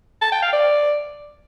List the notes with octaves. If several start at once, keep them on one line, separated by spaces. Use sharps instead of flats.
A5
G5
F5
D5